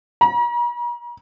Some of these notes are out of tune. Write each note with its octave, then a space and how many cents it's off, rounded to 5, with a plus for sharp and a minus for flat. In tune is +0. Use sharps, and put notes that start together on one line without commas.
A#5 +45